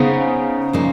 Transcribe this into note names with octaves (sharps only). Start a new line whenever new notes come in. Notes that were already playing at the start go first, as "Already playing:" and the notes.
Already playing: C#3 B3 D#4 G#4 C5 F5
A#2 F3 A#3 D#4